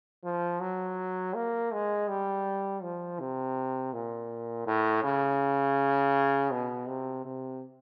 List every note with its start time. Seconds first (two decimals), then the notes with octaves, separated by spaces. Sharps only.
0.24 F3
0.61 F#3
1.34 A#3
1.72 G#3
2.08 G3
2.83 F3
3.20 C3
3.93 A#2
4.67 A2
5.04 C#3
6.51 B2
6.88 C3
7.25 C3